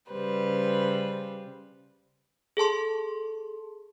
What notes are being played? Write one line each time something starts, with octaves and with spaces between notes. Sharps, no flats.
C#3 G3 B4 C5
G#4 A4 A5 C6